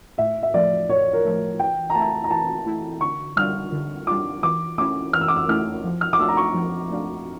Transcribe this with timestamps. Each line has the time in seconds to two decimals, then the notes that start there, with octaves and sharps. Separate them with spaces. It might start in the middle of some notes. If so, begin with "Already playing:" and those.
0.18 A2 E5
0.43 E5
0.54 F3 A3 D5
0.89 A2 C#5
1.13 A#4
1.25 F3 A3
1.59 E3 G5
1.90 A#5
1.95 A3 E4 A5
2.24 A#5
2.31 E3 A5
2.66 A3 E4
3.01 D3 C#6
3.36 G3 D4 F4 F6
3.72 D3
4.07 G3 D4 F4 D6
4.43 E3 D6
4.78 A3 C#4 E4 D6
5.13 E3 F6
5.21 E6
5.28 D6
5.36 E6
5.49 A3 C#4 E4 F6
5.84 F3
6.01 F6
6.13 D6
6.20 A3 D4 F4 E6
6.28 A#5
6.37 C#6
6.55 F3
6.91 A3 D4 F4